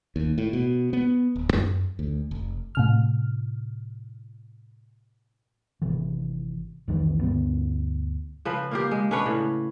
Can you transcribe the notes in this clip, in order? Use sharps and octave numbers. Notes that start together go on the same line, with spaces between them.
D#2
A2
B2
B3
D1
F#2
D2
F1
A2 C3 F6
G#1 C3 E3
C2 F2 D#3 E3
D2 G2 B3
C#3 F3 B4
A#3 F4 G4
G#3
C#4 D4 B4 C#5
A2 C#3